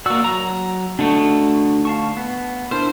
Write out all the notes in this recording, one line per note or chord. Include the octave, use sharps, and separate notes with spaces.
A#3 F#4 D5 E6
F#3 A#5
D3 A3 D4 D#4 F#4
F5 A5 C#6
B3
D4 E4 A#4 C5